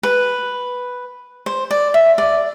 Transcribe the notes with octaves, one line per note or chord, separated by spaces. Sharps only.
B4
C5
D5
E5
D5